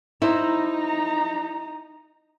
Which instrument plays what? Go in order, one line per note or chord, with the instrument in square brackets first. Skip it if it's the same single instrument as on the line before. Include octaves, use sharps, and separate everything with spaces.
[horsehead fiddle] D#4 A#5 [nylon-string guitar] E4 C5